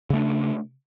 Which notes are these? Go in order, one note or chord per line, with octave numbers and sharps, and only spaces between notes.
C#3 A3 D4